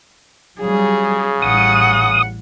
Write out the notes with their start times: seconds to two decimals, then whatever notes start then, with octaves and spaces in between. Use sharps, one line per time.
0.60 C#3 F#3 G3 G#4
1.42 A1 G3 F#5 D#6